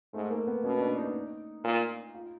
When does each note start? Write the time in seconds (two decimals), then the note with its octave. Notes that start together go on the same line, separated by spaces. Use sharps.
0.13 G#2 A3
0.30 A#3
0.47 B3
0.64 B2 C#4
0.81 D4
0.97 D#4
1.64 A#2
2.14 F4